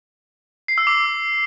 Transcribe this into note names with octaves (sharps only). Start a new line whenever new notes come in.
C7
E6
D6